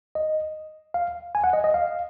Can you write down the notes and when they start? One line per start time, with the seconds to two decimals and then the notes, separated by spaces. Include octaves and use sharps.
0.15 D#5
0.94 F5
1.35 G#5
1.44 F#5
1.53 D#5
1.64 D#5
1.74 F5